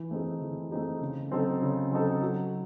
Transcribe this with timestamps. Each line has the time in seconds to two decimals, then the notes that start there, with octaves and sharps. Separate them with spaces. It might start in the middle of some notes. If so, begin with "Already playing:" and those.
Already playing: E3
0.11 A3 C4 D#4 G#4
0.42 E3
0.71 A3 C4 D#4 G#4
1.01 C#3
1.31 F#3 C4 D#4 A4
1.62 C#3
1.91 F#3 C4 D#4 A4
2.22 F#3